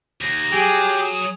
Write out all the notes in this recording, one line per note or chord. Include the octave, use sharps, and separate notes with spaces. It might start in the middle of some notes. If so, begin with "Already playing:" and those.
D#2 A#6
F#3 G4 G#4
D#6